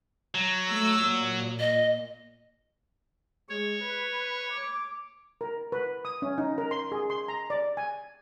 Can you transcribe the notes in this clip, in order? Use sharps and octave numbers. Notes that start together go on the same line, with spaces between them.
F#3
A3 E6
A#2
D#5
G#3 C#5
B4
D6
A#4
B4
D#6
C#4
D#4
A#4
C6
G#4
C6
A#5
D5
G#5